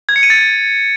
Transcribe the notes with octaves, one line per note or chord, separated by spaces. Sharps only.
G#6
C#7
D#7
A6